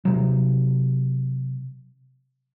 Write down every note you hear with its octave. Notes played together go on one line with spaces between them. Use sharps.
C3 F#3